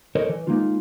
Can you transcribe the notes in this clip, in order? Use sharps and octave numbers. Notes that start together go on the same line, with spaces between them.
A4 A#4 C5 C#5 D#5
E3
G#3 A#3 D#4 F4